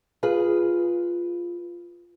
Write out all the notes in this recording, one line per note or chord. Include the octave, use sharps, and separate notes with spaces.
F4 G#4 B4